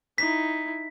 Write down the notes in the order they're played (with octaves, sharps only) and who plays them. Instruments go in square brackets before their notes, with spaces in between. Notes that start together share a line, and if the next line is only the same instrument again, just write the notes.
[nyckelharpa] D#4 E4 [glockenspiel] B6